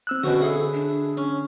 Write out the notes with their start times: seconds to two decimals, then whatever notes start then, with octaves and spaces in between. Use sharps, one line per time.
0.07 C4 E6 F#6
0.24 B2 D3 C#4 F#4 C5
0.42 E4 G#4 A4
0.73 D4
1.17 C#4